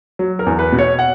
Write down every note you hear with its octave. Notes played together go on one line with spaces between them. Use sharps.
F#3
A#4
E2
B4
B2
C#5
F#5